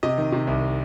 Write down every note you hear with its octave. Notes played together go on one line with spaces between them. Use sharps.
C3 D#5
D#3
C3
C2